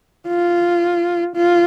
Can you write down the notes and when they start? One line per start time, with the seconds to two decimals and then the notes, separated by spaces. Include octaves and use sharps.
0.27 F4
1.35 F4